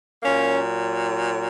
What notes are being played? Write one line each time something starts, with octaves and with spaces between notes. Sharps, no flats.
A#2 F#3 A#3 C#4